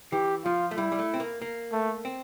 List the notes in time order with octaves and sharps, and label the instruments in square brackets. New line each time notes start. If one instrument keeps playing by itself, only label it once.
[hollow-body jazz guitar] E3 [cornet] G4
[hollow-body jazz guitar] F3 [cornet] F4
[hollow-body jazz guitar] A3
[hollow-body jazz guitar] G3 [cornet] E4
[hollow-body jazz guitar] G3
A3
C4
A#3
A#3
[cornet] A3
[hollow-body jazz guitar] C4